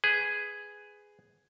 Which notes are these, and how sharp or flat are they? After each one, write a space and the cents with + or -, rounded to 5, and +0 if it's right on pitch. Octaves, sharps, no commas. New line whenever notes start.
G#4 +0 B4 +20